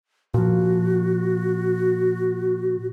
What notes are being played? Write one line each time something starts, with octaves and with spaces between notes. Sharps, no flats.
A#2 F3 F#4